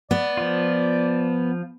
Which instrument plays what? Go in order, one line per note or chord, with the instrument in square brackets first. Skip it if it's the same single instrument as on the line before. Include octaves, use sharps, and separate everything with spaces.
[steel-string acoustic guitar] B3 [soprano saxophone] D5
[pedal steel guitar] F3 F4